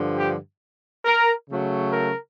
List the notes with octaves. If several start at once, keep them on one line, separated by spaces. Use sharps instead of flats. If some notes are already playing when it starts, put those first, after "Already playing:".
Already playing: G2 D3 F3
G4
A#4
C#3 F#3 A3
A#4